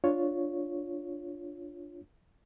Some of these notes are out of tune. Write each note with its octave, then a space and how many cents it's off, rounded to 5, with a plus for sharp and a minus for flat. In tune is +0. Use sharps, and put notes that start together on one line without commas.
D4 +0 F4 +0 C#5 +0